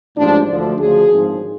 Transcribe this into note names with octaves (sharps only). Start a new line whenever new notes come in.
A1 G#2 F3 D4
D2 D3 F3
D2 C#3 F3 G#4
G#1 G#2 F3